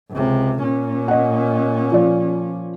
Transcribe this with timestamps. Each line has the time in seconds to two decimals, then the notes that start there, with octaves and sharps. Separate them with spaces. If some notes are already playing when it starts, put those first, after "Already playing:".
0.11 C#2 C3
0.60 A#2 C#4
1.08 D#5 F#5
1.92 F3 D5